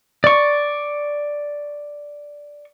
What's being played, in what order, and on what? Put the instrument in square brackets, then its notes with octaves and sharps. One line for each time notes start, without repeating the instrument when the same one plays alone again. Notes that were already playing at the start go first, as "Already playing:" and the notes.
[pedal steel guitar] D5 C#6